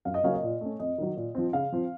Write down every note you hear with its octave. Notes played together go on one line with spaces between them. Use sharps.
F#2 F5
D#5
C#3 F#3 A#3 C#4 F5
D#5
A#2
A3 C#4
F2 D#5
D#3 F#3
A#2
F3 C4
C#3 F5
F3 C4